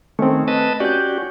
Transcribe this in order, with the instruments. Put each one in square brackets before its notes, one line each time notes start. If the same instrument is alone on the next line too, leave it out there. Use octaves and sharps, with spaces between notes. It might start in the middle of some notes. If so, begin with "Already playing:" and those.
[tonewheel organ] D#3 C#4 [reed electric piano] A3 C4
[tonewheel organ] B4 D#5 A5
[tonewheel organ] C#4 F#4 G4 [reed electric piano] D5 G6